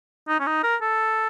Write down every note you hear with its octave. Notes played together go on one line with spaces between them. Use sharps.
D#4
C#4
D#4
A#4
A4